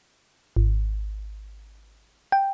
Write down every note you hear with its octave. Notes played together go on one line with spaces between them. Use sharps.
G#1
G5